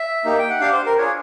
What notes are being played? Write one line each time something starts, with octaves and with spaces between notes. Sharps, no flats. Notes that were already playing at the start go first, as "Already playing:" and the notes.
Already playing: E5
A#3 D#4 G4
G5
F#5
D4 G4 F5
C5
A#4
D4 F4 G#4 C#5